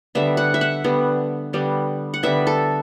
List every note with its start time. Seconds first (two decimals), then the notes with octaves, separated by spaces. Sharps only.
0.15 D3 G3 B3 E5
0.37 F#5
0.54 E5
0.61 F#5
0.84 D3 G3 B3
1.53 D3 G3 B3
2.14 F#5
2.23 D3 G3 B3 E5
2.47 A4